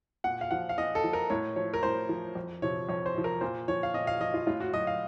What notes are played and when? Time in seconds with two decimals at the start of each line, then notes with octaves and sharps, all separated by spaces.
0.24 A#2 F#5
0.41 F5
0.51 F3 F#5
0.69 F5
0.78 A#2 D#5
0.95 A4
1.04 F3
1.13 A#4
1.30 A2 C#5
1.56 F3 C#5
1.74 A#4
1.83 A2 C5
2.09 F3
2.35 F2
2.62 C3 F3 C#5
2.89 F2 C#5
3.06 C5
3.15 C3 F3
3.24 A#4
3.41 A#2 C5
3.68 F3 C#5
3.83 F5
3.94 A#2 D#5
4.07 F5
4.21 F3 D#5
4.34 F4
4.47 A2 F4
4.60 F#4
4.73 F#3 D#5
4.87 F5